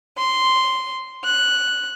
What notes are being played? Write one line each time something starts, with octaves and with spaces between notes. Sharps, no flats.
C6
F#6